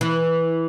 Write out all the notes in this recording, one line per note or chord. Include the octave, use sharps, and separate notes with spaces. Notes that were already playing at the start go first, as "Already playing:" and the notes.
E3